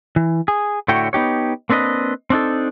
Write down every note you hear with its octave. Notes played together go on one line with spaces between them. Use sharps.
E3
G#4
A2 D3 E4 F#4 C#5 G5
B3 D#4 G4 C#5
A#3 C4 D4 B4 D#5
C4 D4 D#4 A4